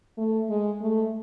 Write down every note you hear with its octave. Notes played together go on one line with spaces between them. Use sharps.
A3
G#3
A3